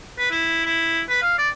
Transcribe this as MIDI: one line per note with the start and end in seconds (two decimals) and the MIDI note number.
0.18 0.30 71
0.31 0.63 64
0.65 1.01 64
1.09 1.22 71
1.22 1.34 77
1.38 1.49 74